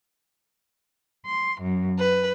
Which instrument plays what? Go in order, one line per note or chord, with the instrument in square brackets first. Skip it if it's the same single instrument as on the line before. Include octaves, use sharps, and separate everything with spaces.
[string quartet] C6
F#2
B4